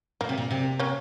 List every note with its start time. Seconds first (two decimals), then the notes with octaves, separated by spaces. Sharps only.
0.21 A#2 A#3
0.29 C3
0.38 A#2
0.51 C3
0.80 A#3 C#4